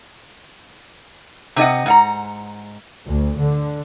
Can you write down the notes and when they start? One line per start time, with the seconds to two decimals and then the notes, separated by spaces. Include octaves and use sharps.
1.56 C3 D#4 D#5 F#5
1.86 G#2 F#5 A#5
3.05 D2
3.39 D3